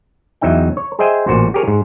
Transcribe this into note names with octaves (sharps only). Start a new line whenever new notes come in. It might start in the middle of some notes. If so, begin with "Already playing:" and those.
E2 F#3 D#4 E5 G5
C#5
G#4 C5 D#5 E5 G5 G#5
A1 A#2 F#4 C5
G4 G#4 A#4 C#5
G#2